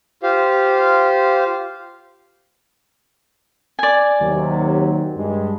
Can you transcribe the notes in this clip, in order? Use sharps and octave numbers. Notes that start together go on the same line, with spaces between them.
F4 G4 C5 F5
D5 G#5
D#2 C3 F#3
G2 G#3